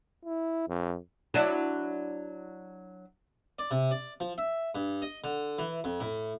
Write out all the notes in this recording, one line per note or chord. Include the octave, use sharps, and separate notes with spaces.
E4
F2
F#3 D4 E4
D5
C3
D5
F3
E5
G2
D#5
D3
E3
F2
A2